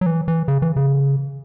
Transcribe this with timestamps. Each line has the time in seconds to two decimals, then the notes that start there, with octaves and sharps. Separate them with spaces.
0.01 F#3
0.06 E3
0.28 E3
0.48 C#3
0.62 E3
0.76 C#3